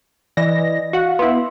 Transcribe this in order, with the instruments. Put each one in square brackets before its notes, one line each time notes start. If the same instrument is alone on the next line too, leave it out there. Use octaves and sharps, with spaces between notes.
[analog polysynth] E3 A#6 [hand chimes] D5 D#5
[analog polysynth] F#4 F#5 [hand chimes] F5
[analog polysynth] B3 E4 [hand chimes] C6